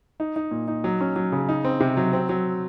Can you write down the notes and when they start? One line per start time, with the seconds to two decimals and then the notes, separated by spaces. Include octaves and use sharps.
0.20 D#4
0.36 D#4
0.51 A#2
0.68 D#4
0.84 F#3
1.01 C#4
1.16 F#3
1.32 C#3
1.49 D#4
1.65 C4
1.80 C3
1.97 F#3
2.13 C4
2.29 F#3